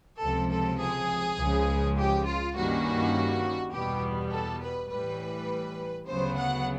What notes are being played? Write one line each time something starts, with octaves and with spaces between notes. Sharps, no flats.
C#2 C3 F3 A4
A4
G#4
C#2 C#3 F3 G#3
G4
F4
G2 D#3 G3 A#3 C#4 F#4
E2 B2 G3 B3 G4
A4
B4
A2 E3 G3 B4
D2 C#3 F#3 B3 C5
F#5